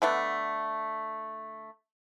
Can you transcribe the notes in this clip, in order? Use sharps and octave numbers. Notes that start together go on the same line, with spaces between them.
D3 A3 B3